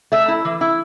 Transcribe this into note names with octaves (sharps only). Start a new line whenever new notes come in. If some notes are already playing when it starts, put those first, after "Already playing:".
A3 E5
E4
E3
E4